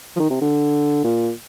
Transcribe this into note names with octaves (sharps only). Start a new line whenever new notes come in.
F3
D#3
C3
D3
A#2